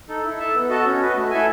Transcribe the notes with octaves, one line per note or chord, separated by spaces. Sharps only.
D#4 A4
E4
A4 E5 A5
B3
F#4 A4 D#5 A5
C#4
F#4 B4 D#5
A3
E4 A4 E5 G#5